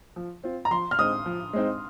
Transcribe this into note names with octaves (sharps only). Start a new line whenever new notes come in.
F3
C4 F4
A#5
F3 C6
F6
G#3 C4 D#4 D#6
F3
G#3 C4 D#4